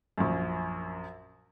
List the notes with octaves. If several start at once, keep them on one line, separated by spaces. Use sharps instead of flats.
A#1 F#2